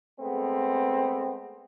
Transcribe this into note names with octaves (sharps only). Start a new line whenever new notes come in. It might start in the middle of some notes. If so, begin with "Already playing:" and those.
G#3 A3 B3 C4